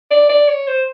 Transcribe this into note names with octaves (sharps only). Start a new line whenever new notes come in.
D5
D5
C#5
C5